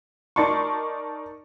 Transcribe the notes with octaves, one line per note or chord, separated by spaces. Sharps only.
D#4 A#4 D5 A5 C6 C#6